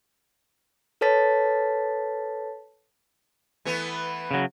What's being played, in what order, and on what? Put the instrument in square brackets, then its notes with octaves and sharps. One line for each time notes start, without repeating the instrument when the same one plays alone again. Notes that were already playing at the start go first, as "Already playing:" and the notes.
[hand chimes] A4 B4 C#5 A5 A6 B6
[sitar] E3 A3 B3
[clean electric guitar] C#3 F#3